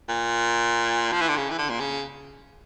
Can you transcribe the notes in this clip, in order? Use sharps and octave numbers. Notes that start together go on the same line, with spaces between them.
A#2
F3
E3
D3
C#3
E3
D3
A#2
C#3